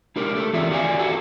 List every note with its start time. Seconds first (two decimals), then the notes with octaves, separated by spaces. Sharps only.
0.16 G#3 D#4 G4 A#4
0.35 A3 A4
0.53 E3 C4 F4 G#4 D5 E5
0.71 F#4 G4 D5 F5 F#5 G#5
0.99 F#4 A4 B4 G#5